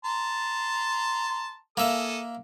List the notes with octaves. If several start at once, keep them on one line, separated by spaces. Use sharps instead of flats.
A5 A#5 C6
A#3 A4 E5 G#5 D#6